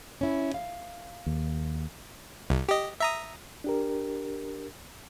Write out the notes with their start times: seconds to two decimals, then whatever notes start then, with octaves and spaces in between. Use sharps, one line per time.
0.21 C#4 E4
0.54 F5
1.26 D#2
2.50 C2
2.69 G4 D#5
3.00 E5 A#5 D#6
3.64 D4 G4 A#4